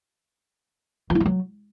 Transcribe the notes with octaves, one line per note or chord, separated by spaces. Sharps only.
F3
E4
G3
F#3